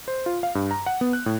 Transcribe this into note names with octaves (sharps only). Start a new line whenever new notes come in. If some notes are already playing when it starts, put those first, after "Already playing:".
C5
F4
F5
G2
A#5
F#5
B3
F#6
A2